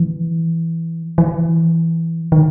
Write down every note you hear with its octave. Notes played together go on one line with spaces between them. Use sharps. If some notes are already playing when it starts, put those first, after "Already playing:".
Already playing: E3
E3
D#3